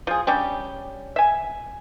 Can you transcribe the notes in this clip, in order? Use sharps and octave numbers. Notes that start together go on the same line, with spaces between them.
F3 G#4
G3 C#4 D4 G4
E5 G#5